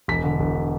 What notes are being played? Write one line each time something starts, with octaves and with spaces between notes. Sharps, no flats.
E1 B6
D3
E1